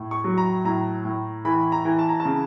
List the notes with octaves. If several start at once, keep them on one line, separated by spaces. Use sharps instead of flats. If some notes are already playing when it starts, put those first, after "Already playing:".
Already playing: A2
C#6
F#3
A#5
A2 A#5
A2
E3 B5
A#5
E3
A5
A#5
A5
C#3